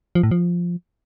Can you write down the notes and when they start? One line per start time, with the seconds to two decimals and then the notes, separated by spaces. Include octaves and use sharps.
0.15 F3
0.23 A2
0.31 F3